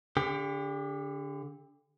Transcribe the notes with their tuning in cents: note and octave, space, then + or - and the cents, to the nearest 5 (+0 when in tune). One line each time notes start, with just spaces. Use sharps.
D3 -20 G4 +35